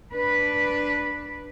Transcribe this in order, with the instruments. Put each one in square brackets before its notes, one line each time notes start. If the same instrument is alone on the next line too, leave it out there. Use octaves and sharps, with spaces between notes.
[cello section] D4 B4